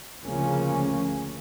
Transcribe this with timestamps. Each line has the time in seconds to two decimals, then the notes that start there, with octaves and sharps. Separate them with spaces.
0.24 D2 C#3 F3 A#3 C#4